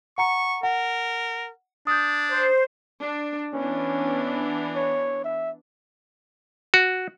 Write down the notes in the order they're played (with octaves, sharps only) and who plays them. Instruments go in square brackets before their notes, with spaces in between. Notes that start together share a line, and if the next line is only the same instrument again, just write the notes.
[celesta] F#5 A#5 C#7 [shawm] C#6
[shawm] A#4 [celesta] F#5
[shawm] D4 [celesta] D#6 G6
[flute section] C5
[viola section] D4
[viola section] E3 B3 D4 [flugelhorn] C#4
[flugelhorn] C#5
E5
[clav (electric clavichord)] F#4